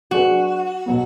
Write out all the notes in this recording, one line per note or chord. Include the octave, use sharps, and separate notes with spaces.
F#3 D4 F#4 G#4 B4
B2 F#3 B3